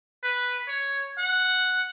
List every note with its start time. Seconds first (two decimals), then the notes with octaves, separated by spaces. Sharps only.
0.24 B4
0.68 C#5
1.18 F#5